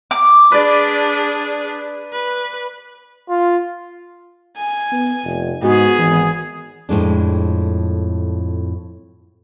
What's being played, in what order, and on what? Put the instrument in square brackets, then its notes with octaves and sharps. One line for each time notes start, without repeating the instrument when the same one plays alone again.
[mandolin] D6
[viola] D4 G#4 [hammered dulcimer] B4 D5
[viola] B4
[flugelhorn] F4
[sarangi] G#5
[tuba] B3
F1
[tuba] G#2 [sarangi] B3 [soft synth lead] F#4 [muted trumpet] G#4
[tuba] G#1 [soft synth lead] E3
[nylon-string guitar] F2 A2 G#3 D4